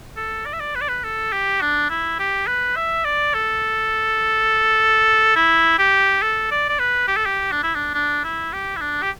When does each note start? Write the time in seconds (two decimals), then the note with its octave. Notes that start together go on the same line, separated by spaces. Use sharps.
0.17 A4
0.46 D5
0.53 E5
0.60 D5
0.75 B4
0.82 D5
0.89 B4
1.04 A4
1.33 G4
1.61 D4
1.90 E4
2.19 G4
2.47 B4
2.77 E5
3.05 D5
3.34 A4
5.36 E4
5.79 G4
6.23 A4
6.51 D5
6.69 D5
6.79 B4
7.08 G4
7.17 A4
7.26 G4
7.52 D4
7.63 E4
7.75 D4
7.94 D4
8.24 E4
8.53 G4
8.76 E4
8.81 D4
9.02 G4